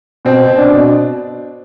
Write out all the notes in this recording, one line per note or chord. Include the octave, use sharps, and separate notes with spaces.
B2 C4
B2
D4
B2